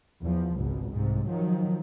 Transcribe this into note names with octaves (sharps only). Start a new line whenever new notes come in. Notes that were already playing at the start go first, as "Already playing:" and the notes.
E2 F3
G#1 C#2 B2
C2 G#2 C3
D#3 F3 F#3